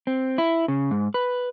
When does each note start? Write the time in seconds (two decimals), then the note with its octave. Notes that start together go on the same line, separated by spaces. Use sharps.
0.07 C4
0.38 E4
0.68 C#3
0.91 G#2
1.14 B4